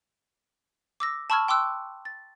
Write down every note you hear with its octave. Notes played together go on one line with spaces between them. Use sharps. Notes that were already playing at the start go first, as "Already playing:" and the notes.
D6 E6 A#6
A5 B5 C#6 E6 F6 G#6
G5 C6 D6 E6 F#6
A6